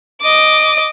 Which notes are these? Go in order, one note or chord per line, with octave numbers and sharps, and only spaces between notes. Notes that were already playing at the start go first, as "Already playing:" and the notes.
D#5 D6